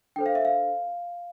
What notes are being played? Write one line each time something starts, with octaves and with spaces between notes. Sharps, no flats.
D4 A4 C5 G5
F5
E5
F5